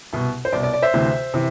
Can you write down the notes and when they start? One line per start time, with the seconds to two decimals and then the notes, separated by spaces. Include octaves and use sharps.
0.13 C2 B2
0.45 C5
0.52 C2 B2 D5
0.63 D5
0.73 D5
0.82 C5 E5
0.94 D2 C3 E3
1.34 C3 E3